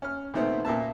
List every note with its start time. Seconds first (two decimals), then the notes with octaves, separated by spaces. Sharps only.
0.02 C#4 F6
0.34 A#2 D#3 A3 B3 C4
0.65 A#2 A#3 E5 A5